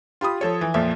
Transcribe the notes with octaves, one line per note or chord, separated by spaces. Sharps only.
F4 G4 B5 D#6
F3 A4 C#5
E3
F2 A#2 F3 E5